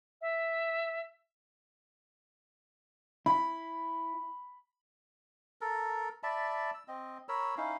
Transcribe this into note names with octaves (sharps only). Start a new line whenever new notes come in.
E5
E4 B5
A4 A#4
D5 E5 A5 B5
E6
C4 D#5
A#4 C#5 B5 E6
C#4 D#4 E4 F5